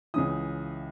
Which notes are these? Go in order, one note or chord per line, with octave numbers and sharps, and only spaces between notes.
C#2 C#3 E3 D#6